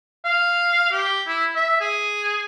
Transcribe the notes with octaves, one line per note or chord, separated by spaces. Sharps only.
F5
G4
E4
E5
G#4